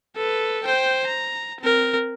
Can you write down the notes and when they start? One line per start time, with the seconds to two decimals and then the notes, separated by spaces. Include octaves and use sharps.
0.16 A4 B4
0.64 C5 G5
1.07 A#5
1.61 C4 A#4